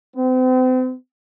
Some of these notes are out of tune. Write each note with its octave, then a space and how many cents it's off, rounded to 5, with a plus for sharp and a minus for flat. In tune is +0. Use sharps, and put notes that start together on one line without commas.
C4 -40